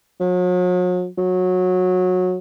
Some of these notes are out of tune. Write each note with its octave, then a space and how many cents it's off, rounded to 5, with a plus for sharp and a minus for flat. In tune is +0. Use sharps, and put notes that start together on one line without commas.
F#3 -40
F#3 -20